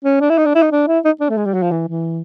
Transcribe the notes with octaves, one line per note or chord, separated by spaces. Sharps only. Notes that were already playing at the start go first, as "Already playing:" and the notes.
C#4
D4
E4
D#4
D4
E4
D#4
D4
E4
D#4
D4
A3
G#3
G3
F#3
F3
E3
E3